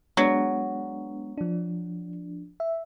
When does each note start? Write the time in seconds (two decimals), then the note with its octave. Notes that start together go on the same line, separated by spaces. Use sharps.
0.17 F#3 G#3 B3 D4
1.38 F3 D4
2.60 E5